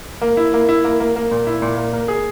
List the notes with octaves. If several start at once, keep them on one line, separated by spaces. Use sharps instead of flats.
A#3
E4
A#3
E4
A#3
A#3
A#3
A#2
E4
A#2
A#3
A#3
G#4